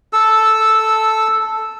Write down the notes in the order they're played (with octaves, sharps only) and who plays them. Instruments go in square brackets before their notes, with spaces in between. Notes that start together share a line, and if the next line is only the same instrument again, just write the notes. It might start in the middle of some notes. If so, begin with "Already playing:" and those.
[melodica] A4 E6